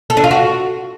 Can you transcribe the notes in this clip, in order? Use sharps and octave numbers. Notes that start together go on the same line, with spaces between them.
A4
D4
F4
F#4